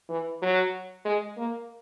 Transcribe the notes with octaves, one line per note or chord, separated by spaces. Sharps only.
E3
F#3
G#3
A#3